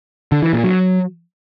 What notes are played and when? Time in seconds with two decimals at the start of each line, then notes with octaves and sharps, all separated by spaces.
0.32 D3
0.42 E3
0.53 A#2
0.64 F#3